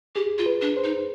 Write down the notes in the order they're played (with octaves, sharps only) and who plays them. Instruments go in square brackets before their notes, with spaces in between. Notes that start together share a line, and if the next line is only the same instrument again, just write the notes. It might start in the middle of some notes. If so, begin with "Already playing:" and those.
[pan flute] G4 [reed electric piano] G#4
[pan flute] F4
[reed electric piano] B4
[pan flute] D4
[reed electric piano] C5
[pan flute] D#4